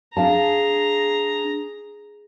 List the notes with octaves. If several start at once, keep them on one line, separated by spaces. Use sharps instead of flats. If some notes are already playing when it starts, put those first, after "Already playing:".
D4 G#4 F5 A5 A#5